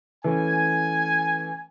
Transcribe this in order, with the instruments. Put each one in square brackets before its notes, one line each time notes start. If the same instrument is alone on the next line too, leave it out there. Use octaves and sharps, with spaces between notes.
[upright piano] E3 A3 C#4 [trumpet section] G#5